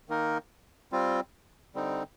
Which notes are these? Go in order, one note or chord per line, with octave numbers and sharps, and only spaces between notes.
D#3 A#3 D#4 A#4
G3 C4 F4
D3 G3 C4 D#4